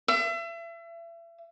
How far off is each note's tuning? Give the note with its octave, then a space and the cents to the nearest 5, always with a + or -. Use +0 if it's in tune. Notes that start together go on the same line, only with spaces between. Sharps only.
E5 +35